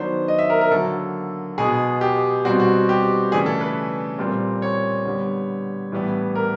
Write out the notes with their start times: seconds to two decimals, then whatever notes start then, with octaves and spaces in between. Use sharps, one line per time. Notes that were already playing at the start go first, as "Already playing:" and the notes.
Already playing: D#3 F#3 B3 D4 C5
0.28 D#5
0.39 E5
0.50 A#4
0.61 A#4
0.71 D3 F#3 A#3 A4
1.58 B2 G#3 B3 G#4
2.01 G4
2.45 B2 G3 C4 F#4
2.60 F#4
2.89 G4
3.31 C#3 E3 A3 D4 G#4
3.46 A4
3.61 B4
4.19 A#2 G3 C4
4.62 C#5
5.05 D3 G3 B3
5.92 A2 E3 G3 B3 D4
6.35 A#4